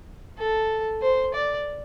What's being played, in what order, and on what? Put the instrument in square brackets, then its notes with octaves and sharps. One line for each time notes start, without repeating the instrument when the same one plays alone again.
[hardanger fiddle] A4
C5
D5